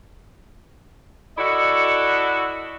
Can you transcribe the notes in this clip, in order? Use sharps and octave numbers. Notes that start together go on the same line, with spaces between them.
E4 F#4 A4 D5 D#5